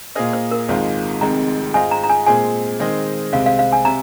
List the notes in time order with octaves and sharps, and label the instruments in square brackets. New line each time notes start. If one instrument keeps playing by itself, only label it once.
[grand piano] A#2 A#3 F4 G#4 D#5 [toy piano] C5
[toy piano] C5
A#4
[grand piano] G#1 G#2 D#3 G#3 F4 [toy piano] C5
[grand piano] F1 F2 D#3 G#3 [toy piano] A#5
[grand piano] G#2 G#3 F4 C5 D#5 [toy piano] G#5
[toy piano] A#5
A#5
G#5
[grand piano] A#2 G#3 C4 G#4 [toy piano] G#5
[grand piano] D#3 G#3 C4 G#4 D#5
[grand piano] C2 C3 G#3 C4 [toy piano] F5
[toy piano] F5
F5
G#5
[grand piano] C3 [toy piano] A#5